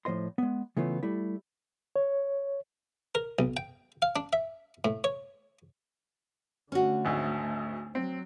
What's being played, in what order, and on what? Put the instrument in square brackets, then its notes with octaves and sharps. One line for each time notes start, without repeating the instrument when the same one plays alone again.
[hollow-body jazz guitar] A2 F3 C5 D#5 C6
G#3 B3
C#3 E3 A3 B3 F4
G3 A3 E4
[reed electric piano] C#5
[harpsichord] A#4
B1
G5
F5
D4
E5
A2
C#5
[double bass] D3 A3 [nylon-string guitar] C#4 F#4
[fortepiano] G#1 D2
[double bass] F#3 [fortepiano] C4